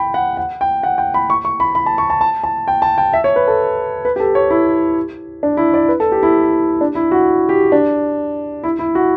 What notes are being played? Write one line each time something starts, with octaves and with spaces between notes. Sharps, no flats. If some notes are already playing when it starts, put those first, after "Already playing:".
Already playing: G5 B5
F#5
F#5
G5
F#5
G5
B5
C#6
C#6
B5
B5
A5
C#6
A5
A5
A5
G5
A5
G5
E5
C#5
B4
A4
B4
G4
A4
C#5
E4
D4
E4
D5
B4
A4
G4
E4
D4
E4
F#4
G4
D4
E4
E4
F#4